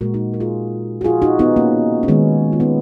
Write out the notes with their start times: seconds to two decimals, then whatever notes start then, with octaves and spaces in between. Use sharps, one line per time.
0.01 A#2 G#3 F#4 A#4
0.14 D#4 F#4
0.34 A#4
0.40 F4 G#4
1.01 F#4
1.04 F4 G#4
1.22 D#4 F#4
1.39 B3 D#4
1.56 A#3 C#4
2.03 C#4
2.08 D#3 G#3 B3 D#4
2.53 F4
2.60 B3 D#4